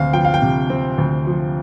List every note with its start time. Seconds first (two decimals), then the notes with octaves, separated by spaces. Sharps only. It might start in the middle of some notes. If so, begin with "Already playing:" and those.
Already playing: D2 C3 C4 F5
0.13 F3 G5
0.25 F5
0.34 G5
0.42 C3
0.70 C4
0.98 D2
1.27 F3